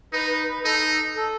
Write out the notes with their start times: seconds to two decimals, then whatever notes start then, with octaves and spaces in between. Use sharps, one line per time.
0.13 D#4 B4
0.30 B4
0.48 B4
0.64 D#4 A4
1.16 A4